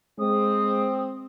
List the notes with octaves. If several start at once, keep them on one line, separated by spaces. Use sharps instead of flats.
G#3 C4 D#6